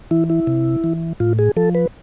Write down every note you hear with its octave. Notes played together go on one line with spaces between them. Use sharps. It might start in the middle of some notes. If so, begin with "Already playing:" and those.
E3 E4
E4
C3
E3
A2 F4
G#4
F3 A4
B4